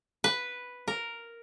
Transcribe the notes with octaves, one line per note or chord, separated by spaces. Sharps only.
B4
A#4